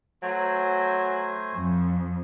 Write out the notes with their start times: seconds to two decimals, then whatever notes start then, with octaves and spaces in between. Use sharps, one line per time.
0.23 F#3 A3 C5 G#5
1.56 F2